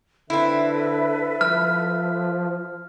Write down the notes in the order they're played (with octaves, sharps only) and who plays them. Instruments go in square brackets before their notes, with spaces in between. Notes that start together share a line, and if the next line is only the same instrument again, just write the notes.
[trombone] D3 [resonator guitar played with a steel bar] C4 E4 [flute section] A4 B4 E5
[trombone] F3 [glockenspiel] F6